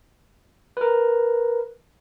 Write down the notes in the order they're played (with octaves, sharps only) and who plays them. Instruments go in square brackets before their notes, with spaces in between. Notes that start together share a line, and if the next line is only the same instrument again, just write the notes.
[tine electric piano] A#4 B4